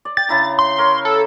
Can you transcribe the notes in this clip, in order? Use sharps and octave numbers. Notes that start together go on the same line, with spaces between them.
D5
G5 A6
C#3 E4 A#5
C6
A#4 C#5
A4